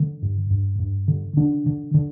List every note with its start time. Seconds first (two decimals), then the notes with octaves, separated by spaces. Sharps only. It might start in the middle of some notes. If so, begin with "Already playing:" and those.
Already playing: D3
0.22 G2
0.50 G2
0.79 G2
1.08 D3
1.37 D3 D4
1.66 D3
1.94 D3